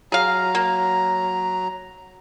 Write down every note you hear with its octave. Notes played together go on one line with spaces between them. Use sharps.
F#3 G#4 F5 A#5
A#3